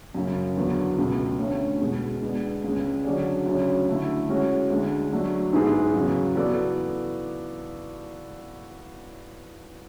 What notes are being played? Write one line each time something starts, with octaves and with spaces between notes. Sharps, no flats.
F#2 C#3 F#3
E2 D3 F#3 B3
C#2 B2 A3
D2 D3 A3 C#4
E2 B2 G#3
G#3 B3 D4
C#2 C#3 G#3
D3 F#3 C#4 G#4 D5
D2 C#3 F#3 C#4
D3 A3 E4
G#3 C#4 F#4
D2 D3 G#3
F#3 A3 D4
G#2 E3 B3 E4 G#4
E2 C#3 F#3
E3 B3 F#4 A4 D5